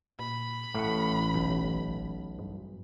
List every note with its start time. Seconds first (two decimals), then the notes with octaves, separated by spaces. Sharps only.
0.19 A#2 B5
0.75 A1 A2 A3 F5 F#5
1.34 F#1 B1
2.39 G2